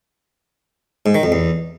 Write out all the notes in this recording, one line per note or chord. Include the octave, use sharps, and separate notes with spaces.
G#2
D#3
F2
E2